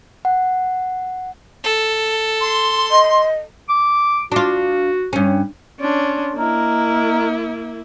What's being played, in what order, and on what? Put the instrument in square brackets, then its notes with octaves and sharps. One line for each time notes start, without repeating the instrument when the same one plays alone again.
[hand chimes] F#5
[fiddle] A4
[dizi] C6
[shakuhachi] D#5
[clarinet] D6
[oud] D4 F4 [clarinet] F#4
[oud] G2 C#4
[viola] C#4 D4 [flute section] C6
[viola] A#3 E4 [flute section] D#5 A#5 F6